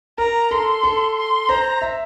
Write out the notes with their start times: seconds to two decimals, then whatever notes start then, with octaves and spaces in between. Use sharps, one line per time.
0.18 A#4 A#5
0.51 A4 C6
0.83 A4
1.16 C6
1.48 C5 A#5
1.82 E5